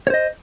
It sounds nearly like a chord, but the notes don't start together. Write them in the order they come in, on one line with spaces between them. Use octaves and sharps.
C#5 C5 D#5